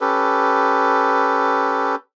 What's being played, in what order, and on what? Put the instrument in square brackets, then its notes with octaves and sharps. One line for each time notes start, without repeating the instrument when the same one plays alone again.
[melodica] C#4 G4 A4 B4